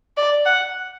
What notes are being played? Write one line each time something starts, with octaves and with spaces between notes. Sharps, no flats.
D5
F#5